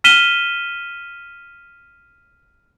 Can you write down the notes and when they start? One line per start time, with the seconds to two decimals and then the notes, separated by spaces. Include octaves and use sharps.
0.04 F6 B6 D#7 E7 G7